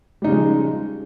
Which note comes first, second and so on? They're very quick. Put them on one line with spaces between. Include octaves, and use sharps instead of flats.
G3 D#4 C#3 F3 G#3